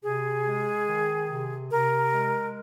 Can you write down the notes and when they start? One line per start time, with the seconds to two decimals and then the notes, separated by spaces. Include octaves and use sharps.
0.03 C3 G#4
0.45 G#3
0.87 D#3
1.30 C3
1.71 C3 A#4
2.13 G#3